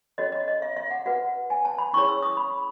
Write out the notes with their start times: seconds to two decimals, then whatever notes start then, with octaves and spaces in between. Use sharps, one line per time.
0.18 C#4 F#4 A4 C#5 D#5
0.32 D#5
0.48 D#5
0.62 E5
0.76 E5
0.91 F#5
1.06 F#4 B4 F#5
1.50 G#5
1.65 A5
1.78 B5
1.93 C#4 E4 G#4 C#5 C#6
2.09 E6
2.23 D#6
2.37 B5